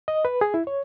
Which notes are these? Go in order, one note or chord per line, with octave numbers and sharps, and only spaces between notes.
D#5
B4
G#4
E4
C#5